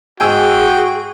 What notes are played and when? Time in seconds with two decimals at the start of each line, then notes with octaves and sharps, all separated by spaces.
0.20 G#2 F#4 G#4 G5 G#5 E6